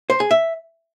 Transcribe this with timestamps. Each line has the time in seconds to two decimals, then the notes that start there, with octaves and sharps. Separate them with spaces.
0.10 C5
0.20 G#4
0.31 E5